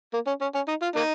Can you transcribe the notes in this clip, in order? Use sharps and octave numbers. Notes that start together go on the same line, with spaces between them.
A#3
C#4
C#4
C#4
D#4
F4
A#3 D#4